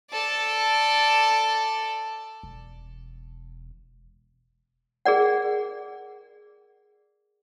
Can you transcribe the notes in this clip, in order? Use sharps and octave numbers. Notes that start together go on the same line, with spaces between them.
A4 D5
E1
G#4 A#4 D5 F#5